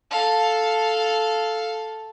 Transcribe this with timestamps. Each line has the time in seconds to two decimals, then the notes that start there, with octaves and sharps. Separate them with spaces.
0.10 A4 F5